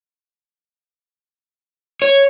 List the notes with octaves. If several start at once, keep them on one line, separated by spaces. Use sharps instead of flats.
C#5